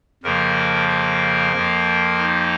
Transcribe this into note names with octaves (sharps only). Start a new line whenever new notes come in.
F2 C#3 F3 A#3 A#4
A#4
F2 F3 A#3
D#4